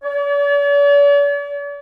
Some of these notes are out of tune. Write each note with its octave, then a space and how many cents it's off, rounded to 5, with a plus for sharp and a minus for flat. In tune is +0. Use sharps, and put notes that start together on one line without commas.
D5 -45